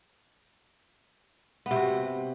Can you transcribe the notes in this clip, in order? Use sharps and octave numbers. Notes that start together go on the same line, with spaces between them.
C3 B3 F#4